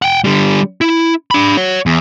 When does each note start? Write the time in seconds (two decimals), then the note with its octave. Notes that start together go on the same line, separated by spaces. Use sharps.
0.02 F#5 G5
0.24 D3 G3
0.81 E4
1.31 D4 B5
1.57 C#5 F#5
1.86 E2